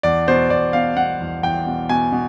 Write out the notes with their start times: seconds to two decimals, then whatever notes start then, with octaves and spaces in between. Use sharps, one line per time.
0.03 E2 D5
0.28 B2 C5
0.50 E2 D5
0.73 B2 F5
0.97 B2 F#5
1.20 E2
1.43 E2 G5
1.67 B2
1.89 B2 G#5
2.12 B2